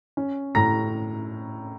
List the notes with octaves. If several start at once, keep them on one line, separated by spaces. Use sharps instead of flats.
C#4
A2 A#5 A#6